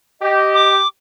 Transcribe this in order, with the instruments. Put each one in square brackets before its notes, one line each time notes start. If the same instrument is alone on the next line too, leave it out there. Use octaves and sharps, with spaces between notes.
[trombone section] G4 [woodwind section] D#5
[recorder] D6